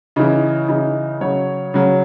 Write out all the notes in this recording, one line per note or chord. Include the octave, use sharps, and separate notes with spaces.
C#3 E3 D#4
C#3 E3 D#4
C#3 F#3 C#5
C#3 F#3